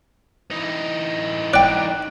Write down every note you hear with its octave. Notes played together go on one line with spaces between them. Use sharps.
E3 D#4
D5 G5 F#6